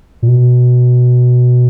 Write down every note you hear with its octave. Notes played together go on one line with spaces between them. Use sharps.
A#2
B2